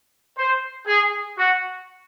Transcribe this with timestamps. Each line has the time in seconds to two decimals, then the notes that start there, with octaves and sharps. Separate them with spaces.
0.38 C5
0.87 G#4
1.37 F#4